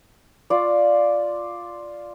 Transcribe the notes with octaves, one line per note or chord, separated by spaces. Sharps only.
F4 D5